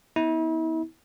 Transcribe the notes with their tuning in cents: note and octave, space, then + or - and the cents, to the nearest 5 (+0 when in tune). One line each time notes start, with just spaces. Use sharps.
B3 +0 E4 -40